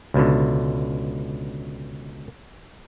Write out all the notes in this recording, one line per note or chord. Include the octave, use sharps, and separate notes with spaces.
C#2 B2 D3